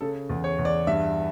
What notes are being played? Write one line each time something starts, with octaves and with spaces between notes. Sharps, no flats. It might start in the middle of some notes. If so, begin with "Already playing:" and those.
C#3 A4
E2
C#5
E2
D5
G2 E5